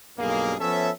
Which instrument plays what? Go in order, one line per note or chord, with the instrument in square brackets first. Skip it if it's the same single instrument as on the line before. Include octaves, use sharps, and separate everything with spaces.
[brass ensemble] B1 G2 A#3 G#4
F3 B3 C#4 A4 C#5 E5